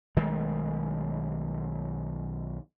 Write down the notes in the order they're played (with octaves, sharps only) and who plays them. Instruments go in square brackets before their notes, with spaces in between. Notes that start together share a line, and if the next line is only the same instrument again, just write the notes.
[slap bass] B1 D#3 G#3 A3